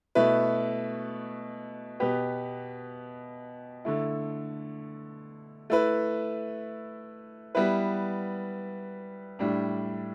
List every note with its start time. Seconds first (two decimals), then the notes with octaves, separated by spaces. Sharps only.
0.15 B2 A3 E4 B4
2.00 B2 B3 G4 B4
3.85 D3 A3 E4
5.70 A3 E4 B4
7.55 G3 B3 E4 B4
9.39 A2 G3 D4